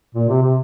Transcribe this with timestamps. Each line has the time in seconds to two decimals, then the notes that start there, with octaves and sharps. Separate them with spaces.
0.15 A#2
0.29 C3
0.42 C3